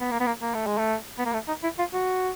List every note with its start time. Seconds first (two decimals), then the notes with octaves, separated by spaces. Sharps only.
0.01 B3
0.11 A#3
0.20 B3
0.26 A#3
0.42 A#3
0.54 A3
0.66 G#3
0.78 A3
1.18 B3
1.25 A#3
1.33 A3
1.48 D#4
1.63 E4
1.79 F4
1.94 F#4